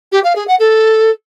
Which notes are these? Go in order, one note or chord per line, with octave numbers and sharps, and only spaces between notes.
G4
F5
G#4
F#5
A4